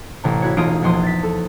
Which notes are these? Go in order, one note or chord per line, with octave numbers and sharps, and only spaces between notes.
A1 C3 A#5
E4 F#4 C#5
E1 A1 D#4 F4 D#6 D7
A#1 E2 F3 C6 D#6
A6 B6
A4